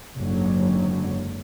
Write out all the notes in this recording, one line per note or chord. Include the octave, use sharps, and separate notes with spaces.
F#1 G#2 D3 F#3